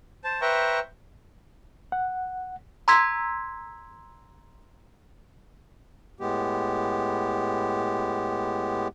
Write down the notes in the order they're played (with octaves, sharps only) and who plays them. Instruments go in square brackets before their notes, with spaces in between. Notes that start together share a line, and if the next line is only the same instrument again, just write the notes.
[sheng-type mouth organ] C5 A5
B4 C5 E5 G5 A#5 C#6
[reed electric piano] F#5
[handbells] A#5 C6 E6 G#6 B6
[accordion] A2 G#3 B3 G4